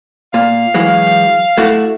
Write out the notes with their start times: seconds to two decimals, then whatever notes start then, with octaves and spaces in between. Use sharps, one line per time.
0.34 A#2 F5
0.74 E3 F#3 G#3
1.58 A3 E4 F#4